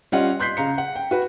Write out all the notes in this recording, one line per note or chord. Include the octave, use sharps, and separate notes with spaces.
G3 C#4 F4 D#5 F#5
C6 F#6 G6 B6 C7
C#3 F5 A#5 C#7
F#5
G5
F#4 B4